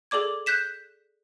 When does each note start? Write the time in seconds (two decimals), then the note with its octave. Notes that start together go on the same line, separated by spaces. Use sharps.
0.11 G#4 A4 D5 D6 G#6
0.46 F#6 G6 B6 E7